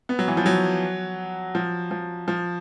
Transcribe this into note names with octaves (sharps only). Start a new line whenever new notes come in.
B3
F#3
E3
F3
F#3
F3
F3
F3